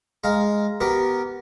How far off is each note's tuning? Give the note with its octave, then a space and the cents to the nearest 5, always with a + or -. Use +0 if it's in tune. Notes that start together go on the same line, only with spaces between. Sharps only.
G#3 +0 F5 +0 A#5 +5
B3 +0 G4 -20 A#4 +0